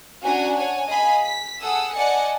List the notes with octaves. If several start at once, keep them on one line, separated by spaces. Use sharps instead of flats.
C#4 D4 F#4 F#5 G#5 A#5
C#5 F#5 G#5 A5
G#4 D#5 F5 G#5 B5
B6
G#4 A4 F#5 D#6 E6
D5 D#5 F#5 G#5 A5 C#7